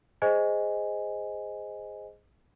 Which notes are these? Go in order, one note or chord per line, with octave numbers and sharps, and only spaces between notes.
G#4 C5 D#5 G#5